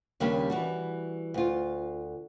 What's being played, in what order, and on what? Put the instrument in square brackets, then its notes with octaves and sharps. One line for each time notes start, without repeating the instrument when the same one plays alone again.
[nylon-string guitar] D#2 C#3 G3 A#3 C#4 D4
E3 G3 F#4
D2 F4